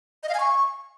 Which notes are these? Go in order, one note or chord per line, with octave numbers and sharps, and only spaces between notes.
D#5
F5
G#5
C#6